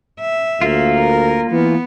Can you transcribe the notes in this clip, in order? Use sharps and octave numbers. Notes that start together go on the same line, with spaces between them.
E5
D2 A#3 F4
A#4
E3 B3